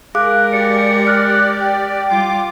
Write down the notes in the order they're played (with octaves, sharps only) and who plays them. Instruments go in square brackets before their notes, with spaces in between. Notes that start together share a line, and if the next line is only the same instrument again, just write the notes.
[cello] G#3 A#4 [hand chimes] G#4 F5 D6 [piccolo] F#6
[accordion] G4 D5 [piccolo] C#7
[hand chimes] F6 [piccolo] F#6
[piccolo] G5
[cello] G3 F4 [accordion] D6